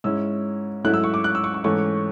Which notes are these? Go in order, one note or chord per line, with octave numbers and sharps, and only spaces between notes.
G#2 G#3 C#4 E4 E6
G#2 F#3 A3 C#4 E4 F#6
E6
C#6
D6
F#6
E6
C#6
C#6
G#2 E3 A3 C#4 C#6